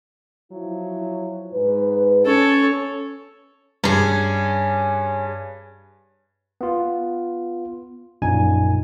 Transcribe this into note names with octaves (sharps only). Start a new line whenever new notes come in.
F3 F#3 E4
G#2 B4
C#4 A4 C#5
G2 C#4 G#4
B3 F4
A#1 F#2 A#2 D#4 G#5